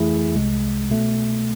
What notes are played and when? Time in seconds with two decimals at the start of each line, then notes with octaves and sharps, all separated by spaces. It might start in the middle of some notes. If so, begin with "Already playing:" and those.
Already playing: F2 E3 A3 E4 G#4
0.34 C2 C3 G#3
0.90 B2 A3